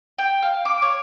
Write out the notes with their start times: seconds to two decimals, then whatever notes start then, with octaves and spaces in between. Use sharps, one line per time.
0.19 G5
0.42 F5
0.65 D6
0.82 C#5